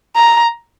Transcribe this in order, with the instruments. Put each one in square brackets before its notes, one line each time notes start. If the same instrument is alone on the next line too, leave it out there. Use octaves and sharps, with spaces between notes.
[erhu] A#5